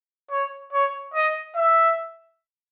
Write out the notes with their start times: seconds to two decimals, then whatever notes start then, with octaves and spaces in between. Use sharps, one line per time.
0.31 C#5
0.73 C#5
1.14 D#5
1.56 E5